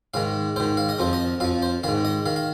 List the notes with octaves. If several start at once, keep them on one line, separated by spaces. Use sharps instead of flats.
G#2 D#3 F5
G#2 D#3 C5
F5
D#5
F2 F3 C5
D#5
F2 F3 F5
C5
G#2 D#3 F5
D#5
D#3 F5
F5